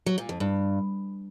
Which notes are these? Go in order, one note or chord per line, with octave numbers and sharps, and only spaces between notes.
F#3
A#2
F2
G2